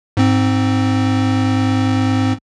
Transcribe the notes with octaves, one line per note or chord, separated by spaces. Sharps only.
G#2 C4